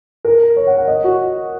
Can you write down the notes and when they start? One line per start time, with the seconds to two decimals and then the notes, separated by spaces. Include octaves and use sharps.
0.25 A#4
0.56 C#5
0.67 F#5
0.78 F#5
0.88 D#5
1.04 F#4